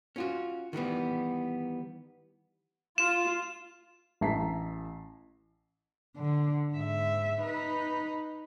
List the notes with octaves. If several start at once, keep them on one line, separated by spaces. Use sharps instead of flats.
C#4 F4 F#4
D#3 E3 G3 B3
F4 E7
A1 E5 A5 A#5 B6 C7
D3
G#2 E5
D#4 B4